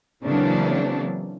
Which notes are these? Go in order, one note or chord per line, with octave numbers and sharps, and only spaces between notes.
C#3 E3 F#3 A#3 C4 D4